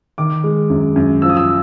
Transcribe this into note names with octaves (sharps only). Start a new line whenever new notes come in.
D#3 D6
G#3
F#2
F#2
F3 E6
D#6
E6